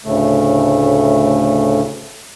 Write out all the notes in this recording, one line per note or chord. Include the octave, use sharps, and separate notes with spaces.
D2 A2 C#3 A3